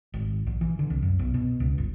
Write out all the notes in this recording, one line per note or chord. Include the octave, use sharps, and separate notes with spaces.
G#1
A#1
E3
D3
C2
F#2
B1
B2
C#2
G1